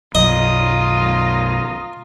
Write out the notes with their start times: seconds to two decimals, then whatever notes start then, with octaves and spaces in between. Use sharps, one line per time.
0.15 B1 F#2 F4 D#5 A#5 D#6